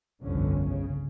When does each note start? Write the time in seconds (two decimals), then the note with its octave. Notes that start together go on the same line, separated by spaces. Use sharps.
0.23 G1 C2 F2 D3 C#4
0.69 C#3